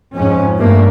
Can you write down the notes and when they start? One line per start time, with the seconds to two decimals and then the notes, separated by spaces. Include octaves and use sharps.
0.16 F2 G#2 C#4
0.57 G2 G3 A3 A#3